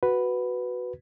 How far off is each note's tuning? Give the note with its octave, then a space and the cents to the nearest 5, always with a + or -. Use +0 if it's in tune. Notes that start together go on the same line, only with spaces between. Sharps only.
F#4 +0 B4 +0